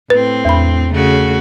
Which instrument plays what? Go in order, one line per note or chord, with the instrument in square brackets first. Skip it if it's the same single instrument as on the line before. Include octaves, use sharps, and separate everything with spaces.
[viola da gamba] A2 C4 [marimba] B4
[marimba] E2 B5
[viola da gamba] C#3 A3 F#4